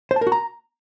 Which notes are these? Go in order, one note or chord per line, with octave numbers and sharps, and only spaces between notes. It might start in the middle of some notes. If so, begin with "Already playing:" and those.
C5
A5
A#4
F#4
A#5